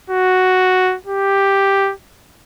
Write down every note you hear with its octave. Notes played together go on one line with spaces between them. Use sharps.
F#4
G4